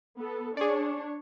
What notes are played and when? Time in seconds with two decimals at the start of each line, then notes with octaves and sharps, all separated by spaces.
0.18 B3 A4
0.57 D4 G#4 C#5 D5